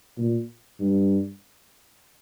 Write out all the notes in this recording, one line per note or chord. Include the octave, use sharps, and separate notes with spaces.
A#2
G2